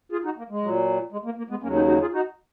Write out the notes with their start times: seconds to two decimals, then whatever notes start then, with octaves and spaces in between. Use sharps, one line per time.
0.12 F4 G#4
0.25 D#4 F#4
0.38 A#3
0.50 G#3
0.63 A#2 F#3
1.12 G#3
1.25 A#3
1.38 A#3
1.50 G#3 B3
1.63 D#2 C#3 F#3 A#3 C#4
1.75 B3 D#4
1.88 D#4 F#4
2.01 F4 G#4
2.13 D#4 F#4